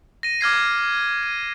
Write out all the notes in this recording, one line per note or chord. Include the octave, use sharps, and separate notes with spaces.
A#6 D#7
D6 F6 G#6 C7
D#7